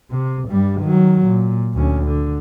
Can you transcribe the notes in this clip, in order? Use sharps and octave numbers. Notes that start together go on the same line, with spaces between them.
C3
G2 G3
D#3 F#3
A#2
D2 C#4
D3